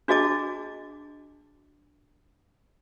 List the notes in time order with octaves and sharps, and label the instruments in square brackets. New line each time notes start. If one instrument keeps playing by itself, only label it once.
[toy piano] D4 F#4 G#4 D#5 A5 D6